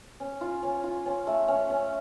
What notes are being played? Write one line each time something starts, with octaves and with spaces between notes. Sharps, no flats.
C#4
F4
C#4
F4
C#4
A3
C#4
C#4